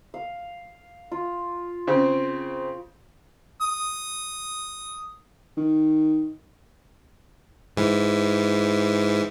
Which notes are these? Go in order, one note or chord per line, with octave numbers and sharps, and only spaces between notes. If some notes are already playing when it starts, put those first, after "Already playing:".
F5
F4
C#3 C4
D#6
D#3
G#2 E3